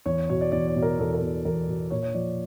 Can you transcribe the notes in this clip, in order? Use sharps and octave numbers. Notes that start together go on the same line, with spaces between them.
E2 C#5
B2 C#5
D5
E2 D5
C#5
B2
A#4
E2 A4
A#4
B2
E2 A#4
B2
A#2 C#5
C#5
F3 D5